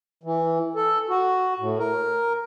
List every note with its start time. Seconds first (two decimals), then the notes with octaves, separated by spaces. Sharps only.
0.23 E3
0.75 A4
1.09 F#4
1.59 A2
1.79 A#4